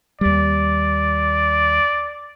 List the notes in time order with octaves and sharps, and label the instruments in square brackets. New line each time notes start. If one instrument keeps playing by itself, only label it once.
[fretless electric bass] D#2 G3 [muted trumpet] D5